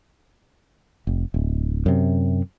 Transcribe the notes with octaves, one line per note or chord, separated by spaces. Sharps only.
F1
D1
F#2 C3